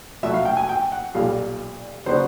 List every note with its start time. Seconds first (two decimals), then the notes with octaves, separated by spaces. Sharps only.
0.23 B2 F#3 A3 E5
0.34 F5
0.45 G5
0.57 G#5
0.69 G5
0.92 F#5
1.14 B1 A#2 G3 F5
2.06 C#3 F#3 B3 D4 C5